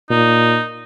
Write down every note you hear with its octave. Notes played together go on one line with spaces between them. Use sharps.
A#2 D#4